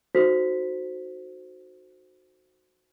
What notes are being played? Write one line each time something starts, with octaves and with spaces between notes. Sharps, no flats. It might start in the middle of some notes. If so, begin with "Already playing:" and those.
D#4 F#4 A4 C5 B6